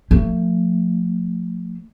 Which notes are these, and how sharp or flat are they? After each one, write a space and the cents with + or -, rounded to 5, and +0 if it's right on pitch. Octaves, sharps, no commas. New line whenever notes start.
F3 +30 A3 +35